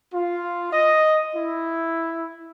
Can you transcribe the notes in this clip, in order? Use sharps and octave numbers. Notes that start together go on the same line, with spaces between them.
F4
D#5
E4